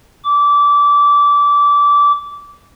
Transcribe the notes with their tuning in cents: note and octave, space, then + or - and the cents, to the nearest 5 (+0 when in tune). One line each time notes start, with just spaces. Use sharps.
D6 -20